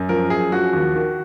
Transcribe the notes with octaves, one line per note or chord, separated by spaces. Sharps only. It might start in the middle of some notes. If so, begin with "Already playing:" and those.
Already playing: F#2
F3 A#4
F#2 G#4
F3 F#4
D#2 F#4
D#3